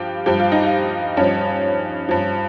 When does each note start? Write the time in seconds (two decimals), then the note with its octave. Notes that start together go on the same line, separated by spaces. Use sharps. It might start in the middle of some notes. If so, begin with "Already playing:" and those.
Already playing: G2 F3 F4 G4
0.26 G2 F3 G4
0.39 F4
0.52 D#4
0.65 F4
1.17 G2 F3 C#4
2.09 G2 F3